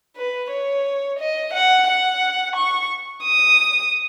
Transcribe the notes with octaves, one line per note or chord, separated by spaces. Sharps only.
B4
C#5
D#5
F#5
F#5
C#6
D#6